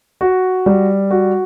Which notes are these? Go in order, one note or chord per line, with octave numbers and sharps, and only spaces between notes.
F#4
G3
F#4